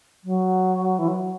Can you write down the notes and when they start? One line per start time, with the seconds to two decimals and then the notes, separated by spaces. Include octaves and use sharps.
0.24 F#3
0.99 E3
1.08 F#3